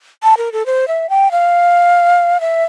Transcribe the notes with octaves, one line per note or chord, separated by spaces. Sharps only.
A5
A#4
A4
C5
E5
G5
F5
E5